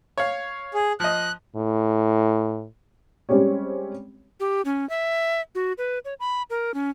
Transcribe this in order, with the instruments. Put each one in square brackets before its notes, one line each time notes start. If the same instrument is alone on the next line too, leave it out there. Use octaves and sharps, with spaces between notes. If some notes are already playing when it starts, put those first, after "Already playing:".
[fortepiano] C#5 F5
[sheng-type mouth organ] G#4
[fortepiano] F3 D#5 [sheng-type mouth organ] F#6
[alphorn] A2
[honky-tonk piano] G3 G#3 C4 C#4 G4 C#5
[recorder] G4
C#4
E5
F#4
B4
C#5
B5
A#4
C#4